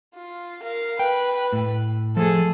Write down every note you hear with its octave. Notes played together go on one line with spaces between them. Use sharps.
F4
A#4 F5
B4 G5
A2
F3 A3 G#4 A4